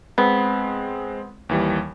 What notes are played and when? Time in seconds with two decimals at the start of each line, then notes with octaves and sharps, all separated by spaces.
0.18 G#3 B3 C4
1.49 D#2 E3 G3